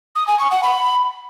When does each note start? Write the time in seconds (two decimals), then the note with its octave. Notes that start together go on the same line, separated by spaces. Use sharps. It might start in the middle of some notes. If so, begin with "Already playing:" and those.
0.15 D#6
0.27 G#5
0.39 C#6
0.51 F#5
0.63 B5